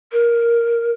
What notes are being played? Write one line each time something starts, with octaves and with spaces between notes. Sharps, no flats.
A#4